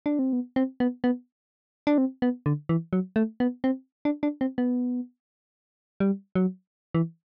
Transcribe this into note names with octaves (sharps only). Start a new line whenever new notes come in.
D4
C4
B3
C4
B3
B3
D4
C4
B3
D3
E3
F#3
A3
B3
C4
D4
D4
C4
B3
G3
F#3
E3